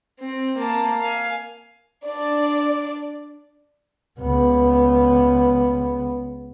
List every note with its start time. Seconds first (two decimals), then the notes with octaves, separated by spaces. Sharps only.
0.21 C4
0.58 A#3 A5
1.02 F5 G#5
2.06 D4 D5
4.20 C#2 B3